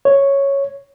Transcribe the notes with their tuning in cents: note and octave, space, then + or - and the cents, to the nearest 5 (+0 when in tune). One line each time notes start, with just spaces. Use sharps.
C#5 -5